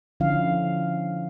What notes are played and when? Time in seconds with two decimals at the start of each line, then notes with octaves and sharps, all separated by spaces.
0.20 D3 F3 C#4 E4 F5